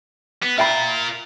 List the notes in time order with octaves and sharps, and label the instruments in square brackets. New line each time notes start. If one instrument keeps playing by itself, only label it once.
[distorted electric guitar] B3
[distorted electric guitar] F4 A#4 [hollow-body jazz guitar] E5 G5 B5